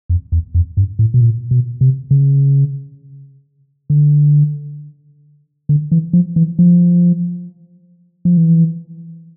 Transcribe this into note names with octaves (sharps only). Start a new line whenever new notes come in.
F2
E2
F2
G2
A2
B2
A#2
B2
C3
C#3
D3
D3
E3
F3
E3
F3
F3
E3